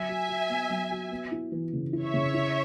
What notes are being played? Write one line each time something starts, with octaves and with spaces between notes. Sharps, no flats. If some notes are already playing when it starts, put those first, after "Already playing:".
Already playing: F#3 E5 G#5
F#4
F#4
B3
F#3
F#4
B3
E4
E3
C#3
E4
C#5 E5
C#3
E4